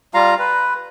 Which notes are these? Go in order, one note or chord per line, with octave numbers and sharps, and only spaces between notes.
G3 F4 F5 A#5
B4